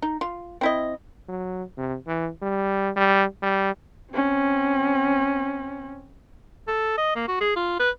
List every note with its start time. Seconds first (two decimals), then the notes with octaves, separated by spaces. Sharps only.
0.02 D#4
0.21 F4
0.61 C4 E4 D#5
1.28 F#3
1.78 C3
2.07 E3
2.42 G3
2.96 G3
3.43 G3
4.13 C4 C#4
6.68 A4
6.98 D#5
7.15 A#3
7.28 F#4
7.41 G#4
7.56 F4
7.80 B4